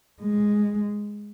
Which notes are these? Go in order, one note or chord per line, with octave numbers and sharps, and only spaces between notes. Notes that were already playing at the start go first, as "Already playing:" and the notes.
G#3